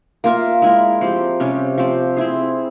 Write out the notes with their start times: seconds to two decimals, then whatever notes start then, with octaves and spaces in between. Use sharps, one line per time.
0.24 A#3 F4 A#4 E5
0.62 G#3 E4 A#4
1.01 F3 C4 G4
1.40 C3 G3 C#4
1.78 F3 C4 G4
2.17 C4 E4 G#4